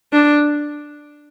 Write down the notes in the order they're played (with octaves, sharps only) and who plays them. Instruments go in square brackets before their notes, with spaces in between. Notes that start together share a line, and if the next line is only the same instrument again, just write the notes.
[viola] D4